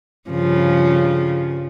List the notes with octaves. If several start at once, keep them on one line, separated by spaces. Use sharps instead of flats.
G2 C#3 F3